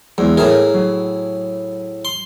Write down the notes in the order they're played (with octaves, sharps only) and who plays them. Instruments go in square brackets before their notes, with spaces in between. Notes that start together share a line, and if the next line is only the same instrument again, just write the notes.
[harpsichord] E2 [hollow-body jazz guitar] F#3 G#3 C5
[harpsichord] A2 G#4 [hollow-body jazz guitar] A#4 E5 A#5
[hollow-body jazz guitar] F#3
[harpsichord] C6